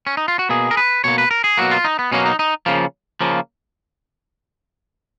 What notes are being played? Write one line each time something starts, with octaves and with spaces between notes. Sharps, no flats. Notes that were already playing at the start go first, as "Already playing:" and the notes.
C#4
D#4
F4
F#4
B2 A#3 G#4
A#4
B4
B2 A#3 C#5
B4
A#4
G#4
B2 F#3 A#3 F#4
F4
D#4
B3
B2 F#3 A#3 C#4
D#4
D#4
C#3 F3 A#3
C#3 F3 A#3